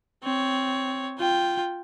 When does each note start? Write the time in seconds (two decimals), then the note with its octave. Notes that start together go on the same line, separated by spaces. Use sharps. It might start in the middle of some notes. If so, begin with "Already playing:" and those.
0.23 C4 C#5
1.19 F4 G5